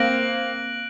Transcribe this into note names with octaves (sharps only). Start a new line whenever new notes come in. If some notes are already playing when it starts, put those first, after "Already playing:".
Already playing: A#3 C4 F#6 A#6 D7 F#7